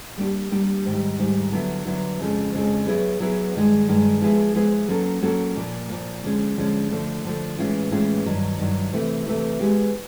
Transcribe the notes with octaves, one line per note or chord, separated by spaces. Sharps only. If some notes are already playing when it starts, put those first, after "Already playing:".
G3 A#3 D4 G4
G3 A#3 D4 G4
G#2 D#3 G3
G#2 D#3 G3
D3 F#3 B3 E4
D3 F#3 B3 E4
F2 C#3 F3 G#3
F2 C#3 F3 G#3
F#3 B3 E4 G#4 B4
F#3 B3 E4 G#4 B4
G2 D#3 G#3
G2 D#3 G#3
F3 G#3 B3 E4 G#4
F3 G#3 B3 E4 G#4
F#3 A#3 C#4 F#4 A4
F#3 A#3 C#4 F#4 A4
A#2 F3 A#3
A#2 F3 A#3
D3 F3 G#3 C#4
D3 F3 G#3 C#4
D3 F3 A3
D3 F3 A3
A2 E3 G#3 C#4 F4
A2 E3 G#3 C#4 F4
G2 D#3 F#3
G2 D#3 F#3
C3 E3 A3
C3 E3 A3
G#3 B3 E4 G4